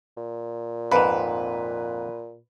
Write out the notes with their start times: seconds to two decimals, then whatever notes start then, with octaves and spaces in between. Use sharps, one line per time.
0.17 A#2
0.91 F2 G#2 B4